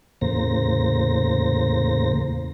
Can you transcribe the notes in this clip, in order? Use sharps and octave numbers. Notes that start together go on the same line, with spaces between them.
E2 A2 C#3 A#3 C5 A#6